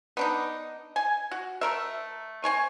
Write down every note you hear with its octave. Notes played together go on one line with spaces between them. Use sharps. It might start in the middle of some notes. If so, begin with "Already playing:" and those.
B3 D4 D#4
G#5
F#4
A3 A#4 E5
C4 G#5 C#6